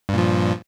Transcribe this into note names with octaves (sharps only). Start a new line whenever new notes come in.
G2 A#2 F3